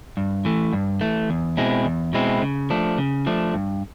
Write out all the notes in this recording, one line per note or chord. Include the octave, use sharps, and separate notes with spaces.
G2
E3 A3
G2
E3 A3
E2
B2 G#3 C4 E4
E2
B2 G#3 C4 E4
C#3
F3 A3 D4
C#3
F3 A3 D4
G2